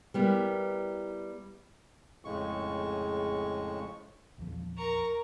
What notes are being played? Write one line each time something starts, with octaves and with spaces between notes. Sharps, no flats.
G3 B3 E4 A#4
F2 A2 C#3 G#3 C#6
A#1 E2 F3
A#4 A#5 C#6